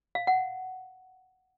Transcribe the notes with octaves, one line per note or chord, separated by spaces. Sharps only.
F5
F#5